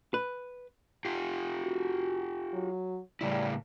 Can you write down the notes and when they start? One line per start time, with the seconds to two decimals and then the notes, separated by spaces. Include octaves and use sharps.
0.14 B4
1.05 F4 G4
1.62 F#4
2.54 F#3
3.21 A2 C#3 G3 E4